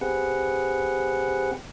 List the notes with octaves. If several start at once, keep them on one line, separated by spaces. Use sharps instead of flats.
C4 G4 G#4 B4 F#5